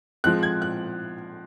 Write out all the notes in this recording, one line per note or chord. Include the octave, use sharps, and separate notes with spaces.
F3 G#3 C4 F#6
G#6
F#6